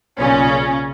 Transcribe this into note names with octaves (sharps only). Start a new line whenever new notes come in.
B1 A#2 C#3 C#4